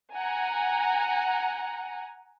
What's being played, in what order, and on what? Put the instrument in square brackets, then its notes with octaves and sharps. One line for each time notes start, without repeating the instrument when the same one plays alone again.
[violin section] F#5 G#5 A#5